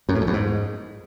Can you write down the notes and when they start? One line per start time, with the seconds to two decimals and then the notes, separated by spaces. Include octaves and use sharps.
0.09 F#2
0.15 A2
0.21 F2
0.27 E2
0.33 G#2